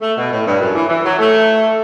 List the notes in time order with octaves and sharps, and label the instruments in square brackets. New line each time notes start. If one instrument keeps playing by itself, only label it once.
[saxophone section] A3
B2
A2
G2
F#2
E3
E3
F#3
A3